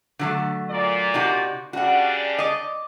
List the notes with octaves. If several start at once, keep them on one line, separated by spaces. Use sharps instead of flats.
D3 F#3 A3
A#2 D5
C3 D#4 F#4
C#3 G3 D4 F#4 F#5
D5 D#5